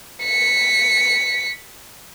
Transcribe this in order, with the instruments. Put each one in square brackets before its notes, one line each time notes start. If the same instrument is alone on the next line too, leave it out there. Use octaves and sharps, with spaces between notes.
[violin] B6 C#7